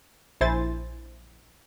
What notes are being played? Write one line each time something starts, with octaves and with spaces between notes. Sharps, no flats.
A#1 E4 C5 G#5 A6